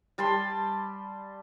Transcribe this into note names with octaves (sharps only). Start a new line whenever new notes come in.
G3 A5 B5 C6